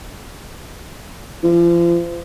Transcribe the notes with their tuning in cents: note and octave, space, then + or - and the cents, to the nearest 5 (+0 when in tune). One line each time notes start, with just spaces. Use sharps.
F3 -35